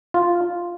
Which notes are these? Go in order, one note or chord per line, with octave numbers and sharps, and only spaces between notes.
F4